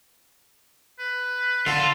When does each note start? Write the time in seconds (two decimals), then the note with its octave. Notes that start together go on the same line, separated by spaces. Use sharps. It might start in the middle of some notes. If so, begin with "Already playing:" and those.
0.99 B4
1.66 D3 F4 A4